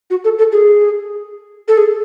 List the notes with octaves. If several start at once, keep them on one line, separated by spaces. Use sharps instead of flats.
F#4
A4
A4
G#4
A4
G#4